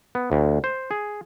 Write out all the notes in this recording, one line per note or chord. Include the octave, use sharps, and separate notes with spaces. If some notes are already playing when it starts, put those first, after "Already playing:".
B3
D2
C5
G#4